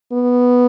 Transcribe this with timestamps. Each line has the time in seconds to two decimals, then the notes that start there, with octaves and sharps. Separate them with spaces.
0.13 B3